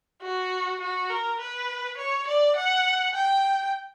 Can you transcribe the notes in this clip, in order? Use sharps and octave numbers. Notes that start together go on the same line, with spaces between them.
F#4
F#4
A#4
B4
C#5
D5
F#5
G5